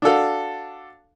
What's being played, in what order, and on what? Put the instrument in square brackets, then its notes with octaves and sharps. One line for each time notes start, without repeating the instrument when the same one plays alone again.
[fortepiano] D4 F#4 A4 F5